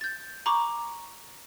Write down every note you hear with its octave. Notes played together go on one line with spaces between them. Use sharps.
G6 A6
A#5 B5 C#6 D6